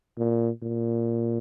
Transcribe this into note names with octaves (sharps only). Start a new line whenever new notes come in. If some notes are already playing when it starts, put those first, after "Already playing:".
A#2
A#2